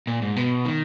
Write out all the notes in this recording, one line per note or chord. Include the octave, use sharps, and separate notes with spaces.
A#2
G#2
B2
D#3